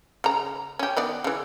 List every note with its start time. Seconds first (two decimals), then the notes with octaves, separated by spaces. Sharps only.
0.24 C#3 A#5
0.79 C#4 G4
0.97 D#3 B3 D5
1.24 C#3 E3